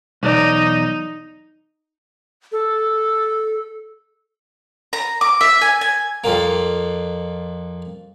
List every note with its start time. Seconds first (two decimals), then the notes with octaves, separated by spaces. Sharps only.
0.23 B1 E2 D#4 D5
2.52 A4
4.93 A#5
5.21 D6
5.41 E5
5.61 G#5
5.81 G#5
6.24 F2 A#3